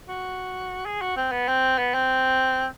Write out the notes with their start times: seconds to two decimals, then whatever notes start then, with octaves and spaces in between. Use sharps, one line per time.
0.08 F#4
0.85 G#4
1.01 F#4
1.16 C4
1.32 B3
1.48 C4
1.78 B3
1.94 C4